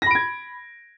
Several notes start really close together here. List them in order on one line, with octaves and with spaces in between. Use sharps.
A#6 B5 D7 G#6